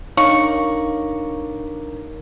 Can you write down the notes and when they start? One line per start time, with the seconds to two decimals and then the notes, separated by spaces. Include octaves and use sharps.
0.17 D4 D#4 A#4 C#5 F5 A#5 C#6